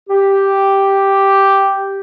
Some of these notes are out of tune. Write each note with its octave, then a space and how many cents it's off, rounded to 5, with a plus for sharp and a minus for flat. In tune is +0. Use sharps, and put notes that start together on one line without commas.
G4 +0